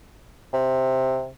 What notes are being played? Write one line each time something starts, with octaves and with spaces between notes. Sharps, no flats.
C3